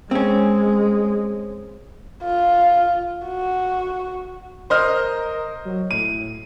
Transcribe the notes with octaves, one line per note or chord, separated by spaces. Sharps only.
G#3 C4 C#4
F4
F#4
A#4 C5 D#5 F6
F#3
A2 D#7